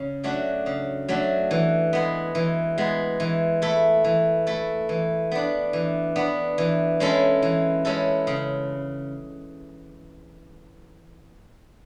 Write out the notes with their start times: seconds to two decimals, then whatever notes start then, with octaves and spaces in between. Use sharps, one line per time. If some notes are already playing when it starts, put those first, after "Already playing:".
Already playing: C#3
0.24 F#3 A3 D4 F#4
0.66 C#3
1.08 F#3 A3 D4 F#4
1.51 E3
1.93 G#3 B3
2.35 E3
2.78 G#3 B3
3.20 E3
3.62 A3 E4 A4
4.04 E3
4.47 A3 E4 A4
4.89 E3
5.32 B3 D4
5.73 E3
6.16 B3 D4
6.58 E3
7.00 G#3 C#4 E4 A4
7.42 E3
7.85 G#3 C#4 E4 A4
8.27 C#3